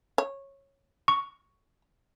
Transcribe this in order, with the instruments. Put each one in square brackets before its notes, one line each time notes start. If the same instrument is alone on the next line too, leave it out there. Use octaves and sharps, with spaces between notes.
[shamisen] C#5
[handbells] C#6